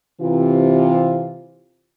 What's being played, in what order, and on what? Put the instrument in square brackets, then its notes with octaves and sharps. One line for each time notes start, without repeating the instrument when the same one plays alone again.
[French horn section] C3 E3 F4